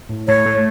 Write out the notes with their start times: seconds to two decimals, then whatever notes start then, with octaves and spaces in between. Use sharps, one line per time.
0.09 A2
0.27 A2 C#5
0.46 A3